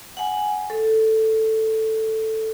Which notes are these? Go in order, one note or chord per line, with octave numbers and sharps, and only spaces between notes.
F#5 G#5
A4